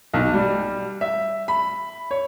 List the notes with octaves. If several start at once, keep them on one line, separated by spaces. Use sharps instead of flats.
B1
G3
E5
B5
C#5